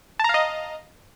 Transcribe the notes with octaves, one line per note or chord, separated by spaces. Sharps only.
D#5 F5 A5 A#5